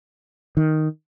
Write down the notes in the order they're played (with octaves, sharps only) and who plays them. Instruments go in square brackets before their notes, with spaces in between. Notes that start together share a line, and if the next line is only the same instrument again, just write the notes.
[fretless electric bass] D#3